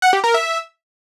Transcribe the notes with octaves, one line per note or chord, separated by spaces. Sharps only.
F#5
G4
A#4
E5